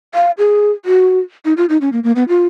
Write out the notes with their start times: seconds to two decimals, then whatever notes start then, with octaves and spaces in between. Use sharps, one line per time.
0.15 F5
0.38 G#4
0.85 F#4
1.45 D#4
1.57 F4
1.69 D#4
1.81 C#4
1.92 A#3
2.04 A#3
2.16 B3
2.28 F4